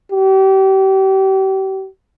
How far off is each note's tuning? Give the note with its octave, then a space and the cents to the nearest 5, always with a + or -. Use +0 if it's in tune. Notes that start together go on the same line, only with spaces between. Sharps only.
G4 -35